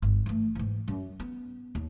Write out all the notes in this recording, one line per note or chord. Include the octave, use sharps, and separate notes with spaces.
G1
E3 A3
G#2 E3
F#2
B3
D#2